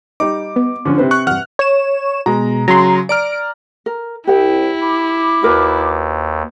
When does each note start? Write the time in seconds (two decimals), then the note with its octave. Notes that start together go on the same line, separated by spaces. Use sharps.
0.20 G3 D#4 D6
0.56 B3
0.85 D3 F3 C#4 D4
0.98 C3 B4 C5
1.11 C#6 F#6
1.27 E2 G2 F#5 F6 F#6
1.59 C#5 E7
2.26 B2 G#3 A#5
2.68 C#3 F#3 A#5 C6
3.09 D5 A#5 F6 D7
3.86 A#4
4.27 C2 E4 G4 F#5 G5
4.82 B5 D6
5.43 D#2 F#4 A#4 B4